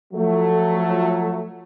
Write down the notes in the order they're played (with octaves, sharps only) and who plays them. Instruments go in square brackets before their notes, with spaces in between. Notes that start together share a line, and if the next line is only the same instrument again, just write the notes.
[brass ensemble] F3 F#3 A3